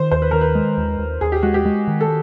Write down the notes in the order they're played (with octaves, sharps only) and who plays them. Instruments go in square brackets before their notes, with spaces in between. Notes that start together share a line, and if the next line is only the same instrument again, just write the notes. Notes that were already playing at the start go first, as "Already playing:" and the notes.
Already playing: [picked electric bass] D#3 [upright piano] C5
[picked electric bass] D#2 [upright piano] C5
[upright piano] B4
[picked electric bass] D#3 [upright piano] A#4
[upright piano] B4
[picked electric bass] G#3
D#2
D#2
[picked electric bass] D#2 [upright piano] G#4
[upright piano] G4
[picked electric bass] G#3 [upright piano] F#4
[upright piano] G4
[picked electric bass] G#3
D#3
[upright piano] A4